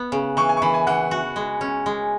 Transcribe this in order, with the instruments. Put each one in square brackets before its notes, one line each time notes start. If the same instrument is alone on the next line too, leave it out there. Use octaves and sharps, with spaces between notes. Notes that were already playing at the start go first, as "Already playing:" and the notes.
Already playing: [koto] B3
C#3
[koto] E3 [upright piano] C#6
[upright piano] G#5
C#6
[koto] E3 [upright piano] B5
[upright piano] G#5
[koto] E3 [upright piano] F#5
[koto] F#4
G#3
C#4
G#3